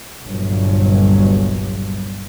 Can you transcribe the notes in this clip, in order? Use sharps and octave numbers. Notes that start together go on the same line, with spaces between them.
G1 C2 G2 A#2 F#3